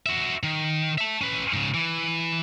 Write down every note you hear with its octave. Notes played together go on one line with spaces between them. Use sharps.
F#4 E5
D#3
E5 A5
C#4 B4
G#2 C#3
E3